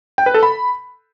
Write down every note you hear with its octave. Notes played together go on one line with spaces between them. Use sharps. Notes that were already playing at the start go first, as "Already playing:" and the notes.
G5
B4
A4
B5